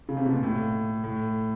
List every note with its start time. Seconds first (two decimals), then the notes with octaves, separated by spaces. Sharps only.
0.09 C#3
0.17 C3
0.26 B2
0.33 A#2
0.43 A2
1.04 A2